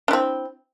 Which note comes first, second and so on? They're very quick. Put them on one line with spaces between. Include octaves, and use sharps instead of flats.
D4 E4 C4